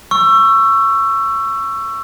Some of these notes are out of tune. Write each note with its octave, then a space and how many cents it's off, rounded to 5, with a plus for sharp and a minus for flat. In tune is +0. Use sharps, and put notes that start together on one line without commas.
C#6 +0 E6 +20